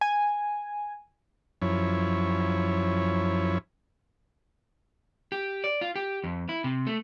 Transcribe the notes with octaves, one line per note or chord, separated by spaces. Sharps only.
G#5
F#2 F3 E4 C#5
G4
D5
F4
G4
F2
E4
C3
A3